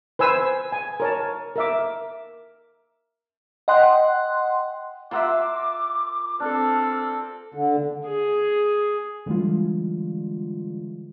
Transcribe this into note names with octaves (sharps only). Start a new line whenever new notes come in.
B4 C5 G#5 E6
G#5
A#4 C#5 A5
A#4 E5 D6
D#5 F#5 G5 C6 F#6
F4 A#4 E5 F#5 C6 D6 E6
C4 D4 A4 F6
D3
G#4
D3 E3 G3 G#3 F4